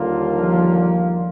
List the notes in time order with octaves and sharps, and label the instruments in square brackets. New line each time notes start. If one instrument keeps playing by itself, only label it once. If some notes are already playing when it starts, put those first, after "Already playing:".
Already playing: [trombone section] D#2 D3 G3 A#3 F4
[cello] F3